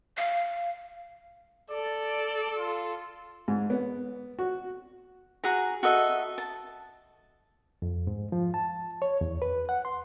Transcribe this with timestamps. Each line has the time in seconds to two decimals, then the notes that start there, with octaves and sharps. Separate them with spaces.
0.18 F5
1.71 A4 D5
2.58 F4
3.48 G#2
3.70 B3
4.39 F#4
5.44 F#4 G#4 A#5
5.83 F#4 A4 D#5 E5
6.38 A5
7.82 F2
8.07 G#2
8.32 F3
8.54 A5
9.02 C#5
9.21 E2
9.42 B4
9.69 F#5
9.85 C6